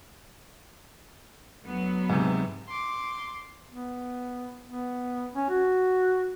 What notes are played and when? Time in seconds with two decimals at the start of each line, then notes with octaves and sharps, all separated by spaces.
1.64 D2 F#3 B3
2.09 G#2 C3
2.68 C6 D6
3.70 B3
4.66 B3
5.35 C#4
5.50 F#4